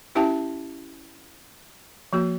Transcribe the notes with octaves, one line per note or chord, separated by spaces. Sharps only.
C#4 E4 G4 E5 G5 A5
F3 A#3 F#4